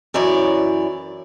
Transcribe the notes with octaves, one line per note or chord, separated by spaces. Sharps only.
F#2 E3 C#5 D5